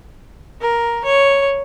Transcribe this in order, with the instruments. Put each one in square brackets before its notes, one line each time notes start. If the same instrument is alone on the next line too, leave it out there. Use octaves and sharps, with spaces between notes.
[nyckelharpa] A#4
C#5